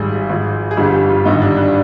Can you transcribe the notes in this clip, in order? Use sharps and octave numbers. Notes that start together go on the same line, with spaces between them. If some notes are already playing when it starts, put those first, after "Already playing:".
Already playing: G#1 G#2 G3 G#4
G#1 G#2 F3
G#4
G1 F2 D3 G3 G4
G4
F4
G#1 G2 D3 G3 D#4
D4
D4